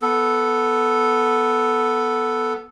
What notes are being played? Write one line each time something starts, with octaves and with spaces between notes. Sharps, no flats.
B3 A4